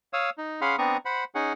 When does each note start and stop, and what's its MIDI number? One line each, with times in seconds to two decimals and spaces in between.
0.13 0.30 73
0.13 0.30 77
0.13 0.30 87
0.13 0.30 88
0.38 0.61 63
0.61 0.76 61
0.61 0.76 68
0.61 0.76 77
0.61 0.76 78
0.61 0.76 83
0.61 0.76 84
0.78 0.97 59
0.78 0.97 60
0.78 0.97 62
0.78 0.97 82
0.78 0.97 85
0.78 0.97 87
1.05 1.24 72
1.05 1.24 78
1.05 1.24 83
1.35 1.53 61
1.35 1.53 63
1.35 1.53 68
1.35 1.53 78